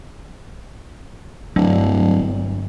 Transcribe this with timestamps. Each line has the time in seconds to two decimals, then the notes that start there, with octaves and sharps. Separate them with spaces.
1.56 D1 G2 F#3 G3 D4
2.13 G1